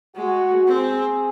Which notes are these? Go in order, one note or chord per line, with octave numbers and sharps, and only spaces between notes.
G#3 F#4
C4 G#4